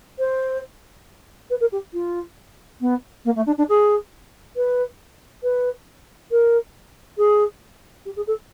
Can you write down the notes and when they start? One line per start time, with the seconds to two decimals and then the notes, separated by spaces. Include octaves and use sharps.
0.19 C5
1.50 B4
1.60 A#4
1.72 G4
1.93 F4
2.80 B3
3.24 A#3
3.35 A3
3.46 D4
3.57 D4
3.69 G#4
4.56 B4
5.43 B4
6.31 A#4
7.17 G#4
8.05 G4
8.16 G#4
8.27 A4